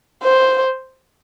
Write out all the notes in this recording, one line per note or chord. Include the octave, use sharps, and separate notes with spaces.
C5